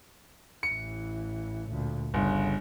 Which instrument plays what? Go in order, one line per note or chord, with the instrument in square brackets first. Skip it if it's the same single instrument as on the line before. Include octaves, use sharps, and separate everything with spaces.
[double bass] A1 E3 [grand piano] C#7
[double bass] D2 A#2
[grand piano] G1 [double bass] C#3